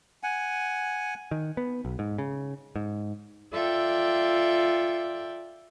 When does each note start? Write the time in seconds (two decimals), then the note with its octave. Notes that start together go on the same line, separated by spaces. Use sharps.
0.23 F#5 G#5
1.31 D#3
1.57 B3
1.85 B1
1.99 G#2
2.18 C#3
2.76 G#2
3.52 F4 A4 D5 E5 G5